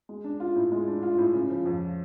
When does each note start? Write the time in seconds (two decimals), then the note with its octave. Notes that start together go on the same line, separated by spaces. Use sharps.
0.09 G#3
0.24 D4
0.40 F4
0.56 A2
0.72 G#3
0.88 D4
1.03 F4
1.18 A2
1.34 C#3
1.50 F3
1.66 F2